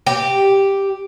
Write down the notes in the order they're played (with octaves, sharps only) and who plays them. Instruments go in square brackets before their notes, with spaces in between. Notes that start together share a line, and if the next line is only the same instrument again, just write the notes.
[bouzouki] G4